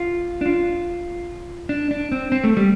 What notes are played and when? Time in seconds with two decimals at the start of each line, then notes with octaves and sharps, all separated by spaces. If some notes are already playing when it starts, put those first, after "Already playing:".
Already playing: F4
0.41 D4
0.46 F4
1.69 D4
1.91 D4
2.12 C4
2.32 C4
2.44 A3
2.57 G3